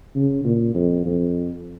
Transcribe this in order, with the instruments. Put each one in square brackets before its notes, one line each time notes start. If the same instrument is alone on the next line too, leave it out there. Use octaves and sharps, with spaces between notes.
[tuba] C#3
A#2
F2
F2